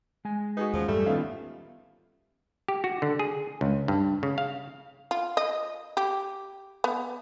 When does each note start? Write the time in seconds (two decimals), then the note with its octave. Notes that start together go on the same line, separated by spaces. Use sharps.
0.25 G#3 G#5
0.57 D#4 F#4 G#4 B4
0.73 D#2 F3 B3 C#4
0.88 F#2 A2 E3 G3 A3
1.06 D#3 B3 C#4 D#4 F4 E5 F5
2.68 G4
2.84 F#4
3.02 D3
3.19 G#4
3.61 C#2
3.88 G2
4.23 C#3
4.38 F5
5.11 F4
5.37 D#5
5.97 G4
6.84 B3